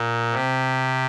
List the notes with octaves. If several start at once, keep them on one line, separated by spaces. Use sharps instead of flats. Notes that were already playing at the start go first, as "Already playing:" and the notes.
Already playing: A#2
C3